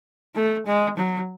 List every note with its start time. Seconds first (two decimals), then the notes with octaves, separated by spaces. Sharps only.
0.35 A3
0.66 G#3
0.97 F#3